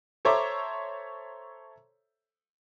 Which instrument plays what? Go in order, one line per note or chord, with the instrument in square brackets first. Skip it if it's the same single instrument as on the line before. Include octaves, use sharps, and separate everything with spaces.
[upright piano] A4 C5 C#5 E5 A#5 D6